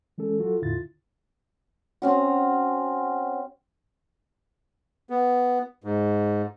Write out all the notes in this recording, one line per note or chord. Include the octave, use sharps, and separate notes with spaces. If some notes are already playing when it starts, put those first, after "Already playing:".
E3 G#3 C#4 A4
F#3 F4 F#4 A4
E2 A2 D3 E4 F4 A6
C4 C#4 F#4
B3
G#2